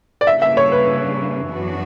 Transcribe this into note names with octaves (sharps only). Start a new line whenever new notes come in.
D5
C#3 G3 A#3 D4 E5
E5
C#5
B4
F#2 E3 B3 D4 F#4